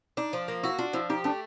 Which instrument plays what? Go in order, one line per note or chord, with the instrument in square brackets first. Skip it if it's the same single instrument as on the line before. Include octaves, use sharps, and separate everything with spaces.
[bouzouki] D4 [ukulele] D#4
[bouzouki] F3
A#3
[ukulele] E4 [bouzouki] F#4
[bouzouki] D4 [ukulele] F4
[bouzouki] F3 [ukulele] E4
[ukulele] D#4 [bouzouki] G4
[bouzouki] A3 [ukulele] D4